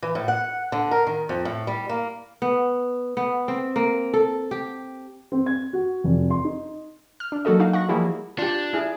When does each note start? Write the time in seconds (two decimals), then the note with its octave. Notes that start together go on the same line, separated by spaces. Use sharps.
0.02 E3
0.15 A2
0.28 F#5
0.72 D3
0.91 A#4
1.07 D#3
1.29 F2
1.45 A2
1.67 G3
1.89 A#3
2.42 B3
3.17 B3
3.48 C4
3.76 A#3
4.14 A4
4.51 G4
5.32 C4
5.46 G#6
5.73 F#4
6.04 F1
6.30 C6
6.45 D#4
7.20 F6
7.32 D4
7.45 F#3 A#3 F#4 A4 D#5
7.59 D#4 F#4 F5
7.73 F#5 C#6 A#6
7.89 F3 G3 A#3 E4 G#4
8.39 D4 F4 G4
8.73 E4 G#4